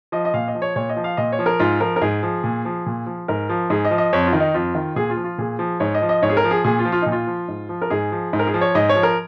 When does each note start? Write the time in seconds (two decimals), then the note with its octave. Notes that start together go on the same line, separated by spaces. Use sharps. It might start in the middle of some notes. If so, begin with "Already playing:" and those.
0.12 F3 D#5
0.25 D#5
0.34 A#2 F5
0.48 D#5
0.55 F3
0.62 C#5
0.76 A#2 C#5
0.89 D#5
0.97 F3
1.04 F5
1.17 A#2 D#5
1.32 C#5
1.39 F3
1.46 A#4
1.59 G#2 F4
1.80 F3 A#4
1.96 A#4
2.01 G#2 G#4
2.23 F3
2.44 A#2
2.65 F3
2.86 A#2
3.07 F3
3.28 G#2 A#4
3.49 F3
3.70 G#2 G#4
3.85 D#5
3.91 F3
3.98 D#5
4.13 F2 C#5
4.26 F4
4.33 D#3
4.40 D#4
4.54 F2 F4
4.75 D#3
4.96 A#2 G#4
5.10 F4
5.17 F3
5.24 F4
5.38 A#2 G#4
5.59 F3
5.80 G#2 C#5
5.95 D#5
6.02 F3
6.09 D#5
6.22 G#2 C#5
6.30 G#4
6.37 A#4
6.44 F3
6.51 G#4
6.64 A#2 G#4
6.79 F4
6.85 F3
6.92 F4
7.02 A#2 D#4
7.12 F4
7.27 F3
7.48 G#2
7.69 F3
7.82 A#4
7.90 G#2 G#4
8.12 F3
8.33 G#2
8.39 A#4
8.47 G#4
8.54 F3
8.61 C#5
8.75 G#2 D#5
8.89 C#5
8.96 F3
9.03 A#4